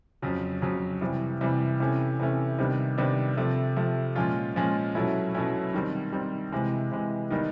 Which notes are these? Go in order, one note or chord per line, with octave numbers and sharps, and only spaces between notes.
F2 C#3 F#3
F2 C#3 F#3
C3 E3 G3
C3 E3 G3
C3 E3 A3 C#4
C3 E3 A3 C#4
C3 D#3 G3 B3 D4
C3 D#3 G3 B3 D4
C3 F3 A3
C3 F3 A3
A#2 F3 G#3 C#4 F4
A#2 F3 G#3 C#4 F4
B2 F#3 A3 C#4 E4
B2 F#3 A3 C#4 E4
D#3 G3 C4
D#3 G3 C4
C3 E3 G#3
C3 E3 G#3
D#3 G3 B3 D#4